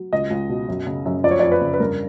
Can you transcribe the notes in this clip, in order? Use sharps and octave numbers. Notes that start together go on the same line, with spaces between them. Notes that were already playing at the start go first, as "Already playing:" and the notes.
Already playing: F#3
C#2 D#5
C#2
B2
F#2
C#3
F#2
F2 D5
C#5
F2 D5
B4
C#3
B4
G2 A#4